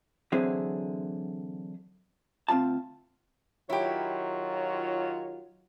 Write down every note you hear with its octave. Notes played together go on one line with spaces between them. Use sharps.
D3 E3 F#3 C4 E4 G#4
D2 C4 C#4 F4 A5
D#3 F#3 E4 F4 G4 C#5